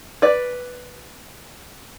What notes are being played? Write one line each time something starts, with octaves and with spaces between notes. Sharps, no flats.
B4 D5